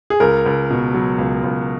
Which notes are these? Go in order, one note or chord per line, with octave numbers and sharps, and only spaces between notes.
G#4
C#2 A#4
C#2
B2
F#3
C#2
C#2